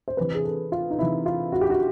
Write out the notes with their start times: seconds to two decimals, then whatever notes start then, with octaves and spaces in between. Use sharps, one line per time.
0.08 C5
0.17 C3 E3 B4
0.34 G#4
0.45 A4
0.72 F4
0.90 D#4
0.98 C3 E3 E4
1.26 F4
1.52 F#4
1.61 G4
1.70 F#4